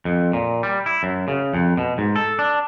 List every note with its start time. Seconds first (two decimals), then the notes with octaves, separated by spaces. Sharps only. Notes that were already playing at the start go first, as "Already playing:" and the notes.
0.05 F2
0.33 A#2
0.63 G3
0.86 E4
1.03 F#2
1.28 C#3
1.54 F2
1.78 B2
1.98 G#2
2.16 A4
2.39 D4